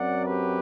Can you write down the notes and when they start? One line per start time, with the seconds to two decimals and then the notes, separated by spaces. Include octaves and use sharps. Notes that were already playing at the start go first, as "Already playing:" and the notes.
Already playing: F#2 F#3 C4 D5 F#5
0.25 G4 B4